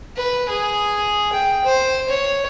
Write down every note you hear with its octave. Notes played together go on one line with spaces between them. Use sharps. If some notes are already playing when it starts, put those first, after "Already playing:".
B4
G#4
G5
C5
C#5